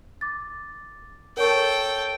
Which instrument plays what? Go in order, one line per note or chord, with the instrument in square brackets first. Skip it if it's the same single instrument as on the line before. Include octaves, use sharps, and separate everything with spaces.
[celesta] D6 A6
[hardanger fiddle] A4 G5 [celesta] A#4 C#5 C#6